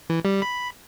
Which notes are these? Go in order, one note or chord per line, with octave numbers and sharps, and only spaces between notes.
E3
G3
B5